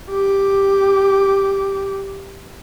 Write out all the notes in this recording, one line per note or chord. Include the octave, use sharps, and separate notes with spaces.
G4 D6